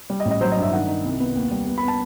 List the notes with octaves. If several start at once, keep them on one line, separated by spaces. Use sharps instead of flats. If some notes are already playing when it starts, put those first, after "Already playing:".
G3
D#5
A1
D#5
F#3 C5
D#5
G2
E5
D#3 F#5
D#4
C2
B3
D#2
G3
B3
B5
B3
A5